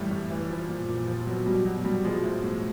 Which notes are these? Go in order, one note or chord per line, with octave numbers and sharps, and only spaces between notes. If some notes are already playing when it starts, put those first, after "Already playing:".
Already playing: A2 E3 G3
A2
E3
F3
A#2
A#2
F3
B2 F#3
B2 G3
B2 F#3
B2 G3
F3 G#3
A2
A2